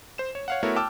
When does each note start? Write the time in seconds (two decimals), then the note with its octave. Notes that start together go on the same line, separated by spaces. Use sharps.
0.18 C5 E7
0.35 C#5
0.48 C#5 F5 F#5
0.63 A3 B3 E4 F#4 A#4 C#5
0.76 G5 A5 D6 E6 F6